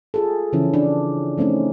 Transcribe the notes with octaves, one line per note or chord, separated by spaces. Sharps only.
F4 G#4 A4
C#3 E3 F3 C#4 E4
D4
F3 A3 C4 C#4 D#4